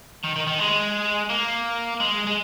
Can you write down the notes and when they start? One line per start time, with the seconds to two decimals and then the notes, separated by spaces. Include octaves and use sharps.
0.24 D#3
0.36 D#3
0.47 D#3
0.59 G#3
1.30 A#3
2.00 G#3
2.27 G#3